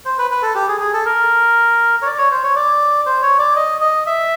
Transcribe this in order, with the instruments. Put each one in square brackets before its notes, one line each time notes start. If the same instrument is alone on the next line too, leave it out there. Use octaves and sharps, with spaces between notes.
[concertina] C5
B4
B4
A4
G4
G#4
G#4
A4
A#4
C#5
D5
C#5
C5
C#5
D5
C5
C#5
D5
D#5
D#5
E5